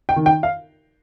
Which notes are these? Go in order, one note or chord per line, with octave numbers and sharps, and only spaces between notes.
G5
D#3
G5
F5